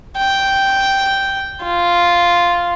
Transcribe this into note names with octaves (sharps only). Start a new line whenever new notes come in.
G5
F4